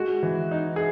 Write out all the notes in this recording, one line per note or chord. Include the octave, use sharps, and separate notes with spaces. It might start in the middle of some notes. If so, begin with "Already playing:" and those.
Already playing: G#3 F#4
E3
D#4
G#4